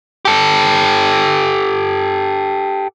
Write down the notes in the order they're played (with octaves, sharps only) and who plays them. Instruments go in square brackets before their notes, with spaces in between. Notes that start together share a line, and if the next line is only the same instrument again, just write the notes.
[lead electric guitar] G4 A4